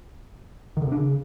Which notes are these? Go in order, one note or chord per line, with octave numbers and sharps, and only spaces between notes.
D#3
D3
C3
D4
C#3